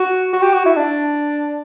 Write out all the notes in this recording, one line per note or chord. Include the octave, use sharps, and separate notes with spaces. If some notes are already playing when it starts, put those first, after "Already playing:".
Already playing: F#4
F#4
G4
F#4
E4
D4